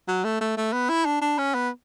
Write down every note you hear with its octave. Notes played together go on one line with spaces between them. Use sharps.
F#3
A3
A3
A3
B3
E4
D4
D4
C#4
B3